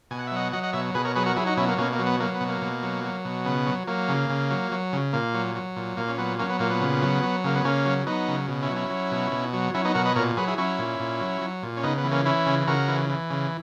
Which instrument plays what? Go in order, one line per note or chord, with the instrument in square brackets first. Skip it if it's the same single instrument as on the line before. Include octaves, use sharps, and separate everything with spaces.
[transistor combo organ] B2 G#5
F#5
E5
F#3 D#5 F#5
F#3 D#5 F#5
D#5 F#5
B2 C#5 E5
B2 G#4 B4
A#4 C#5
F#3 G#4 B4
F#4 A#4
F#3 E4 G#4
D#4 F#4
B2 C#4 E4
A#3
B2 A#3 C#4
A#3
F#3
B3
F#3 A#3
B3
B2
A#3
B2
F#3
F#3
B2
C#3 B3
F#3
F#3 A#3
C#3
C#3
F#3
F#3
C#3
A#2 A#3
F#3
F#3
A#2
A#2 A#3
C#4
F#3 B3
F#3 A#3 C#4
B3
A#2 A#3
B3
C#3
F#3
F#3
C#3 A#3
B3
C#3 A#3 C#4
F#3
F#3 B3 D#4
C#3
B2
C#4 E4
F#3
C#4 E4
F#3
B2
B2
F#3
F#3 C#4 E4
B3 D#4
B2 F#4 A#4
B4 D#5
A#2 A#4 C#5
F#3 G#4 B4
E4 G#4
F#3 C#4 E4
A#2
A#2
F#3
F#3
A#2
C#4
C#3 B3 D#4
B3
E3
A#3 C#4
E3 C#4 E4
C#3
C#3 F#4 A#4
E3
E3
C#3